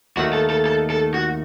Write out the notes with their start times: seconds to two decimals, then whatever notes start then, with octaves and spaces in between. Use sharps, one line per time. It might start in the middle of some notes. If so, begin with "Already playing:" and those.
0.17 D#2 D#3 A3 F#4
0.33 A4
0.50 A4
0.66 A4
0.90 A4
1.14 F#4